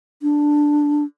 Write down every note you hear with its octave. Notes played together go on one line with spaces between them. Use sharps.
D4